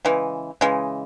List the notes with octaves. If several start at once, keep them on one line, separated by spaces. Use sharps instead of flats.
C#3 E3 G#3
C#3 E3 G#3